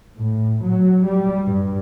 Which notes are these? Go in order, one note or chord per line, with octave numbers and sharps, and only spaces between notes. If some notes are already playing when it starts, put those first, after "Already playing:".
A2
F#3
G3
G2